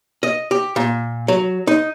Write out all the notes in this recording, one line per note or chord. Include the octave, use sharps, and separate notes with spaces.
D#5
G4
A#2
F#3
D#4